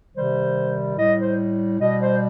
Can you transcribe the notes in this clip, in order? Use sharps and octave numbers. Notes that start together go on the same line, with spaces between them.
C3 D#3 G3 C5
A2 G3 D#5
C5
B2 G3 D#5
C5